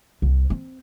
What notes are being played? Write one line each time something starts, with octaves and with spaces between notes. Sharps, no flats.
C2
C4